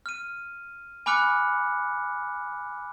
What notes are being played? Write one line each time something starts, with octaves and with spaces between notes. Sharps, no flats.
F6 D#7
G#5 B5 D6 F6 F#6 C#7